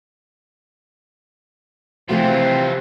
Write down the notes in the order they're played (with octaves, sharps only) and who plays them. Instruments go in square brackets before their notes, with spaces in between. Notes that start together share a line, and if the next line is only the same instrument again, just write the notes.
[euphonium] C3 [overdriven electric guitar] E3 F4 [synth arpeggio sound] F3 A3 F#4 [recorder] C4